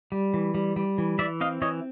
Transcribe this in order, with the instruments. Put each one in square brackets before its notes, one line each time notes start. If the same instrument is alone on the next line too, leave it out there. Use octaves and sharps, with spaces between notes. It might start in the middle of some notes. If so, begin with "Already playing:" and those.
[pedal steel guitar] G3
E3
G3
G3
E3
E3 D5 E5
C4 D#5 F5
E3 C#5 D#5